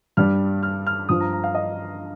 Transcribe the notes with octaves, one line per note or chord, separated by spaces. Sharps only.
G2 G3 F6
F6
F6
G2 F3 D#6
A#5
A#5
F5
D#5